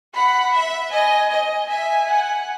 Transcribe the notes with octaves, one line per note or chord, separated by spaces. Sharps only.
F#5 B5
E5
D#5 G#5
D#5
E5 G#5
F#5